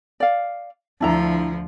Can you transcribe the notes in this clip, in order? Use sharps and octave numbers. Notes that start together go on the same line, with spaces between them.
D5 F5
D2 F3 D4 E4 A#5